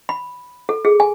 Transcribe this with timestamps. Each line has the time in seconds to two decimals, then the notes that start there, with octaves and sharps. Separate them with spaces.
0.09 B5
0.69 A4
0.85 G#4
1.00 G#5